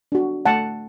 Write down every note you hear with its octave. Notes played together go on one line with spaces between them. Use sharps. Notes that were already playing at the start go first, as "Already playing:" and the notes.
D4 F#4
A3 F#5 A5